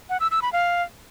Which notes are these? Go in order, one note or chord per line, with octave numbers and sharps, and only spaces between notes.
F#5
E6
E6
B5
F5